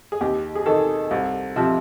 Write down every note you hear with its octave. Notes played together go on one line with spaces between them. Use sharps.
G#4
D#2 G4
G#4
D#3 A4
C2
C3 F3